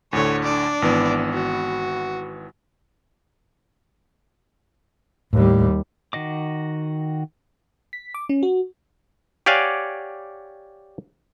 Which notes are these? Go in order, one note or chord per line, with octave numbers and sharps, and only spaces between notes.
D2 A2 D3 C#5
D4 D5
G#1 E3 B3
F#4
D#2 A2 G3
D#3 F#4 D#5 D6
B6
D6
C#4
F#4
G4 C#5 D5 F5 F#5 G#5